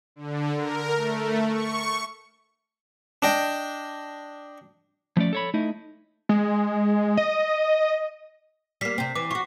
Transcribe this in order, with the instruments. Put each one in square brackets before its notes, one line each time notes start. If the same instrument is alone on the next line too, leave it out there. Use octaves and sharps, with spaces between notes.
[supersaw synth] D3
A#4
A3
C#6
[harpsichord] D4 D#5 G5
[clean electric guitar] F3 A3 C#4 D5
A4 C#5 B5
A3 D#4 E4 D#5
[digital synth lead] G#3
D#5
[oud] G3 A#3 [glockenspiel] B6 C7
[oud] C3 C4
[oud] E3 [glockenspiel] D6
[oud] F4 F#4 [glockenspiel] C#6